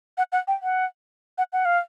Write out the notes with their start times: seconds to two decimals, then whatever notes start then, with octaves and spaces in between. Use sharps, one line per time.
0.18 F#5
0.32 F#5
0.48 G5
0.63 F#5
1.38 F#5
1.53 F#5
1.65 F5